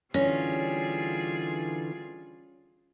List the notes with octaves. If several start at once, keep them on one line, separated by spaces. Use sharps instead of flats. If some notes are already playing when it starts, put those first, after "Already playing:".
D3 E3 G3 C#4 F4 G#4 C#5